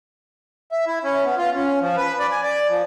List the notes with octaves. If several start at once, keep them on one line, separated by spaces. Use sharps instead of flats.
E5
E4
C#4
B3
F4
C#4
F3
B4
D5
G#5
D5
F3